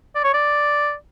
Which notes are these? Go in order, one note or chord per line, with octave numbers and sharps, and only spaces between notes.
D5
C#5
D5